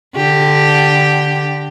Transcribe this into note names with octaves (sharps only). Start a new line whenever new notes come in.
D3 G4